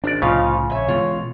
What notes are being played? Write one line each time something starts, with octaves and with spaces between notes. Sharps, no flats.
G#1 D4 D5
C2 A2 C#3 F3 D#4 F4 F5
A#1 C#5 E5 G#5
B2 E3 G#3 F4